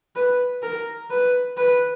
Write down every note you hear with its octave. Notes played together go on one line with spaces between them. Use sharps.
B4
A#4
B4
B4